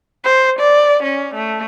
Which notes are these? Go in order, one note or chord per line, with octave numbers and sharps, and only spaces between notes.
C5
D5
C#4
A3